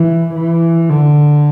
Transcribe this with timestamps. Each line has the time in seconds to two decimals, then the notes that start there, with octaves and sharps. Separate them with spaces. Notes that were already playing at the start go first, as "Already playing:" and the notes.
Already playing: E3
0.34 E3
0.89 D3